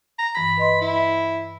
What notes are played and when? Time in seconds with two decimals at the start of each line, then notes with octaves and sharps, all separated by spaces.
0.18 A#5
0.35 G2 E3 B5 A#6
0.57 B4 D#5 C6
0.81 E4